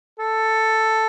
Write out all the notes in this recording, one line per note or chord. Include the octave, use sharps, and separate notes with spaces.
A4